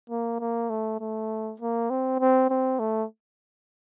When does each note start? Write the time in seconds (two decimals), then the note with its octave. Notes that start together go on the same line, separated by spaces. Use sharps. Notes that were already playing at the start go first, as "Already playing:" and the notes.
0.10 A#3
0.40 A#3
0.70 A3
1.00 A3
1.60 A#3
1.90 C4
2.20 C4
2.50 C4
2.80 A3